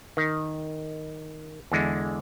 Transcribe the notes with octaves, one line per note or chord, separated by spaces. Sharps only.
D#3
E2 D3 G#3